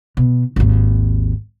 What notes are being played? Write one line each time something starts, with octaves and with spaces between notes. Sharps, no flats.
B2
G#1 D#2